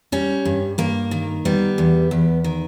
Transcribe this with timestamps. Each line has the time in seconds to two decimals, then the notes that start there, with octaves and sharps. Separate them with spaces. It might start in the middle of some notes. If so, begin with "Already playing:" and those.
0.12 G3 C#4
0.45 G2
0.78 G2 A#3
1.11 D#3
1.45 G3 B3
1.78 E2
2.11 E2
2.44 D#3